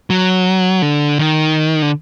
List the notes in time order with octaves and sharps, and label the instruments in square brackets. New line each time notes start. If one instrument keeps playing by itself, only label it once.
[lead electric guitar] F#3
D3
D#3
D3